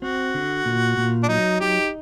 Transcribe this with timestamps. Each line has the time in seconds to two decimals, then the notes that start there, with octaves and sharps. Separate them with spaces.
0.02 C4 F#4
0.34 D3
0.65 A#2
0.97 A#2
1.23 D4
1.28 F#3 D#4
1.60 D#4 G4